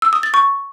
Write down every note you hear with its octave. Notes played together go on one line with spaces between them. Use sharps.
E6
D#6
A6
C#6